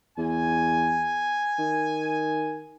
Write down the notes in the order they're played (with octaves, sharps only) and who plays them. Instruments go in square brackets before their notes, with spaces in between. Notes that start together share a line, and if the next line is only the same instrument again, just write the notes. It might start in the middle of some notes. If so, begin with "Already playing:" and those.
[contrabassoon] E2 [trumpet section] G#5
[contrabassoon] D#3